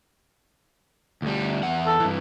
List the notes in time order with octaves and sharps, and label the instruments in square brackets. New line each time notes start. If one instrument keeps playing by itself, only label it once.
[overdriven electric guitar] D2 G3
E2 F#5
[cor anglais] A4
[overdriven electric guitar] G2 E3